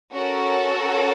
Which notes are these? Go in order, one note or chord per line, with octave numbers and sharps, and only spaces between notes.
C#4 F#4 A4 A#4